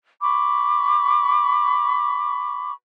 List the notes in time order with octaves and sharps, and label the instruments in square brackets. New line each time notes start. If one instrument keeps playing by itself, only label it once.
[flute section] B5 C#6 D6